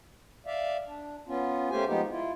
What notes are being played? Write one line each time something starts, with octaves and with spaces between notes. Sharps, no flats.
D5 E5 F5
D4
B3 C#4 F4
A3 A#3 C#4 G4 C5 G#5
F3 G#3 B3 D#4 G4
E4 F4